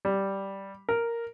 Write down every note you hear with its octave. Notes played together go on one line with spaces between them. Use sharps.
G3
A#4